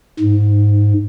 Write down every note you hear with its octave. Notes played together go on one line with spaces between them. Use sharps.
G#2